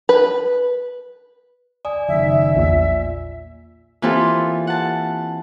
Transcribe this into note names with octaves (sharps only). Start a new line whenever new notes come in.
B4
D5 G#5 D#6
F#1 D#3 E5
A#1 E2 A#2
E3 A#3 C4 F4 G4 A4
F#5 A5